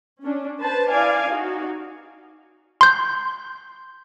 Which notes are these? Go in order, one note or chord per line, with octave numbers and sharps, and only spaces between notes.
C#4 D4
B4 C5 A5
E4 D5 F5 G#5
D#4 F#4
C6 G6